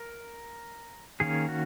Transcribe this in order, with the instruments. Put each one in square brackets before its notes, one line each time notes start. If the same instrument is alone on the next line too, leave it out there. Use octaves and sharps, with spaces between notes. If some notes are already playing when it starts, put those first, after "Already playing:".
Already playing: [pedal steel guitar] A#4
D#3 A#3 C#4 G#4
F#4